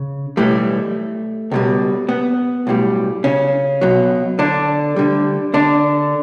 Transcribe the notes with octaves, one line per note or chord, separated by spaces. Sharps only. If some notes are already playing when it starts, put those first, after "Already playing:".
Already playing: C#3
B1 A2 E3 G3 A3
C#2 B2 G3
B3
B1 A2 G3
C#3 C#4
B1 B2 F#3
D3 D4
D2 D3 G3
D3 D4